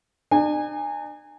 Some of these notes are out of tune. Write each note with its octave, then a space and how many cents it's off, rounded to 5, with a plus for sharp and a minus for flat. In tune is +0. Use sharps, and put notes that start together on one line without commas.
D4 +45 G#5 -20